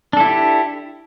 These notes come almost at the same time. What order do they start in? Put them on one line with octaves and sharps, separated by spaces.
D4 A4 E4 G4